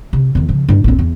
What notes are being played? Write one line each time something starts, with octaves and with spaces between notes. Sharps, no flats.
C3
E2 D#3
C#3 F3
G2 D4
A#1 C4
E2